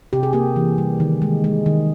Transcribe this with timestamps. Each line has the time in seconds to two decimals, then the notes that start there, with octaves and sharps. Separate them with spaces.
0.13 C3 G4
0.23 G#4
0.33 A#3 G4
0.56 E3
0.78 G3
1.00 D#3
1.22 G#3
1.44 G#3
1.66 D#3